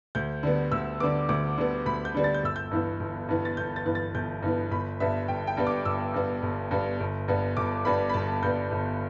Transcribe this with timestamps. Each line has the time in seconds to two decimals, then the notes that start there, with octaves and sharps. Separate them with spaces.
0.15 D2 G6
0.43 D3 G3 B3
0.72 D2 E6
1.00 D3 G3 B3 D6
1.29 D2 D6
1.58 D3 G3 B3
1.86 D2 B5
2.05 G6
2.15 D3 G3 B3
2.24 A6
2.34 G6
2.43 G1 E6
2.56 G6
2.71 G2 E3 B3
3.00 G1
3.29 G2 E3 B3
3.45 A6
3.57 G1 G6
3.76 A6
3.86 G2 E3 B3
3.95 A6
4.14 G1 G6
4.43 G2 E3 B3
4.71 G1 B5
5.00 G2 G3 B3 E5
5.28 G1 G5
5.47 G5
5.57 G2 G3 B3
5.67 D6
5.85 G1 E6
6.14 G2 G3 B3
6.42 G1
6.71 G2 G3 B3
7.00 G1
7.28 G2 G3 B3
7.57 G1 D6
7.85 G2 G3 B3 B5
8.09 B5
8.14 G1 A5
8.42 G2 G3 B3 G6
8.71 G1